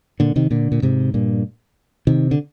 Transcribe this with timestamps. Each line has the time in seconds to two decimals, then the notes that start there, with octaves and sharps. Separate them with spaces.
0.20 A#2 D3
0.36 C3 D#3
0.51 A#2 D3
0.72 A#2
0.82 G#2 C3
1.14 G2 A#2
2.07 C3 D#3
2.31 D3